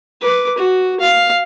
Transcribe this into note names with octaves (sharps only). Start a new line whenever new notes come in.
B4 D6
F#4
F5